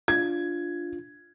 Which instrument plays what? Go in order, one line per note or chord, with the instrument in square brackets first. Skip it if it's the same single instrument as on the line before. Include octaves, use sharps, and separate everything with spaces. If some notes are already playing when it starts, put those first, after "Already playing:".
[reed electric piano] D4 F4 [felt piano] G#6